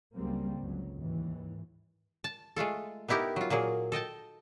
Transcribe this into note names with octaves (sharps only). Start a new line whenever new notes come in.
C#2 C#3 F#3 G3 A#3 C4
G1 C#2 F#3
D#2 G#2 E3
A5
G#3 A3 F4 A4
B3 D#4 E4 G4 A#4
F#3 F4
A#2 F#3 A#3 G#4
A4 D#5 G5 A5